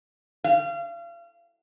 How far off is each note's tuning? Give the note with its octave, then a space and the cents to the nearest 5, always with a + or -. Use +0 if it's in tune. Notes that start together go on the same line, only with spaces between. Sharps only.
F5 -35